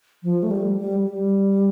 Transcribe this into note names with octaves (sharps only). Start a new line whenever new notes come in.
F3
A3
G3
G3
G3